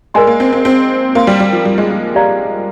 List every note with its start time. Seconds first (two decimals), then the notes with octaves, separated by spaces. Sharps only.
0.14 G#3 A#4 D5 G#5 C6
0.27 A#3
0.40 C4
0.52 C4
0.65 C4
1.15 A#3 C5 F5 C6
1.27 G3
1.40 G3
1.53 F3
1.65 G3
1.78 G#3
1.90 G3
2.15 G4 D5 F5 A#5